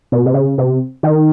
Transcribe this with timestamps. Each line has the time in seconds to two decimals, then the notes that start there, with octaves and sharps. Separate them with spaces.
0.12 B2
0.26 C3
0.34 C#3
0.58 C3
1.03 D#3